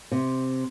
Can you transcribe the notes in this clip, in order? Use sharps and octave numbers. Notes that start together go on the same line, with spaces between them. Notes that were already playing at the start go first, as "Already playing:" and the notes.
C3